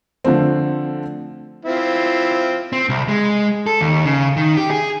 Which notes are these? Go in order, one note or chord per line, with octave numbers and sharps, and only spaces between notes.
D3 F3 A3 C4
C4 E4 F4
C4
C2
G#3
A4
D#2
C#3
D#3
G4
G#4